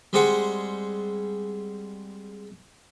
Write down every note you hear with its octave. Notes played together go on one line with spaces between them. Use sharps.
G3 G#3 C4 G#4 F#5